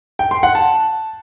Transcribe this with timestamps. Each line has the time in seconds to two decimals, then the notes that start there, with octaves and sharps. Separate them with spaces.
0.19 G5
0.31 C6
0.43 F#5
0.55 A5